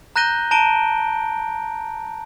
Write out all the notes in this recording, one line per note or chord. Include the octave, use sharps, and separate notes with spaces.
A#5 F#6 G6 A#6 D#7 G7
A5 A#5 D7 G7